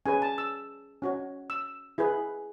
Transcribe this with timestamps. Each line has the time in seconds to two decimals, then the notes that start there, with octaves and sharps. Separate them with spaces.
0.06 C#4 G#4 B4 G#5
0.22 A5
0.38 E6
1.02 C#4 F#4 C#5
1.50 E6
1.98 E4 G#4 B4